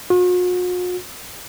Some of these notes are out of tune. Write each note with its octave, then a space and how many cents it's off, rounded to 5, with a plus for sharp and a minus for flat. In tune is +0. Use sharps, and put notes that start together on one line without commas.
F#4 -45